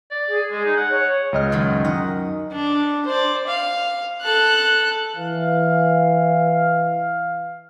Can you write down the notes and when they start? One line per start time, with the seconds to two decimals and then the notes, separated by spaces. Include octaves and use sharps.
0.11 D5
0.28 G#4
0.51 G#3
0.65 D#4
0.76 F#5
0.91 C#5
1.33 C#2 D#5 F6
1.52 F#2 D#3
1.84 D#3 D#5 F#5
2.52 D4
3.06 C5 D5
3.47 F5
4.21 A4 F#6
5.16 E3 F5